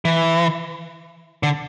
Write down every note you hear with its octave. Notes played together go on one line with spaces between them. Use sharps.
E3
D3